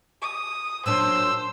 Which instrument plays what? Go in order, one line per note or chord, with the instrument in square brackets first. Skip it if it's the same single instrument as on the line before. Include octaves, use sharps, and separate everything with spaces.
[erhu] D#6
[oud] A#2 F#3 D4 [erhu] C5 [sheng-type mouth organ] E6